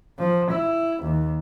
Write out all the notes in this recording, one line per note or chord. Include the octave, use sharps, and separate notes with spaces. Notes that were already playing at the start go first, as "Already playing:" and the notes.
F3
E4
D#2